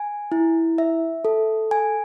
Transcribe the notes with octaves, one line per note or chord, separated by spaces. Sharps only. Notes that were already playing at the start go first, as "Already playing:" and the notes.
Already playing: G#5
E4
E5
A4
G#5